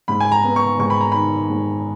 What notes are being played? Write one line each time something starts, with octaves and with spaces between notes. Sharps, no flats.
G#2 B5
G#5
A#5
B3
C#6
G#2 C#6
B5
A#5
D#3 B5
G#2